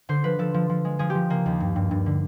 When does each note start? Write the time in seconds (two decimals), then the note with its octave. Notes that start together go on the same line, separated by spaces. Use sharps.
0.09 D3 C5
0.24 F3 B4
0.39 F3 A4
0.54 F3
0.69 F3
0.85 G#3
0.99 F3 G#4
1.10 G4
1.15 F3
1.30 C#3 A#3
1.46 D#2
1.60 G2
1.76 G2
1.91 G2
2.06 D3